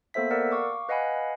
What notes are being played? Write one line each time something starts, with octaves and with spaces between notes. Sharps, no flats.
A#3 B3 A4 C5 E5 B6
A#4 D5 F#5 E6
F5 C#6 D6
B4 D#5 F5 F#5 G#5 B5